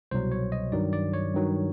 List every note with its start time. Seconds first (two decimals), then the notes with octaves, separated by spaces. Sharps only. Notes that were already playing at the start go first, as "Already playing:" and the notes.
0.11 C2 B2 F#3 C5
0.32 C#5
0.52 D#5
0.72 G2 D#3 F#3 D5
0.93 D5
1.14 C#5
1.33 G2 D#3 F#3